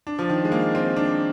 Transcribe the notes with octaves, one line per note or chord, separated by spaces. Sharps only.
D4
F3
D#3
G#3
A#3
C4
D4